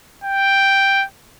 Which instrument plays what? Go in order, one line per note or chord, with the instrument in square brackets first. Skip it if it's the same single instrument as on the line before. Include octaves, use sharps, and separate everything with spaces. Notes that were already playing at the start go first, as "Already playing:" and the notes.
[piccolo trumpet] G5